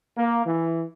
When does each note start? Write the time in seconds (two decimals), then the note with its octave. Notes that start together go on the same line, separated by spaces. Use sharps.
0.16 A#3
0.45 E3